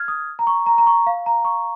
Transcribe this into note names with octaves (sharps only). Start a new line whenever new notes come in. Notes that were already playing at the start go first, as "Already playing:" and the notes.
Already playing: F6 G#6
D#6
A#5
C#6
A#5
A#5
C#6
F5
A#5
C#6